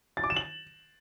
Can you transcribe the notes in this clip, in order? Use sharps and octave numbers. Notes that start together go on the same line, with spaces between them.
A6
D6
E7
F#7